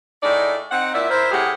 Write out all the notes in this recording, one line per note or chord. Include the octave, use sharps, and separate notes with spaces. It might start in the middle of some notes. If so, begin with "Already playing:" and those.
A2 D#4 G#4 D5
C4 D#4 F#5
A#2 E4 D5 E5
E4 A#4 C5
A2 C3 G4 G#4 F#5